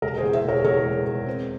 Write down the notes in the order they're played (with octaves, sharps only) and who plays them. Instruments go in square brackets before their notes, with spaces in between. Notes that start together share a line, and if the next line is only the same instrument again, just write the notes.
[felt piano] E1 A#4
G#4 C5
E2
C5 E5
E1 A#4 C#5
E2 A#4 C#5
E1
E1
C4